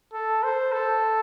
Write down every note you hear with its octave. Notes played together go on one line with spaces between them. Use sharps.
A4
C5
A4